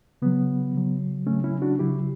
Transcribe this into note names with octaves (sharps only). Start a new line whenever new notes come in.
C#3 F#3 B3
C#3 F#3
C#3 F#3 A3 C#4
C#4 E4
D4 F#4
C#3 F#3 E4 G4